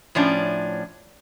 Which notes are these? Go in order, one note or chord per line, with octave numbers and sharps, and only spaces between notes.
A2 F3 C#4 D4